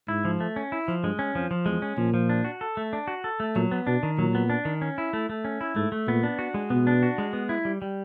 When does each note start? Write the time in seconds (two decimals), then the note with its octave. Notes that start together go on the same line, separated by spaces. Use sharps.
0.08 G#2 E4
0.25 F3
0.40 A3
0.56 C#4
0.72 E4
0.88 F3
1.03 G2 G#3
1.19 C#4
1.35 F2 F3
1.51 F3
1.66 E2 G#3
1.82 C#4
1.98 A#2 F3
2.14 F3
2.29 D4
2.45 F#4
2.61 A4
2.77 A3
2.93 D4
3.08 F#4
3.24 A4
3.40 A3
3.55 A#2 F#3
3.71 B3
3.87 B2 D4
4.03 D#3
4.18 A#2 F#3
4.35 B3
4.50 D4
4.65 D#3
4.82 C#4
4.98 E4
5.13 A3
5.29 A3
5.45 C#4
5.61 E4
5.76 G#2 A3
5.92 A3
6.07 A#2 B3
6.23 D4
6.39 F#4
6.54 G#3
6.70 B2 B3
6.87 D4
7.03 F#4
7.18 G#3
7.33 B3
7.49 E4
7.65 G3
7.82 G3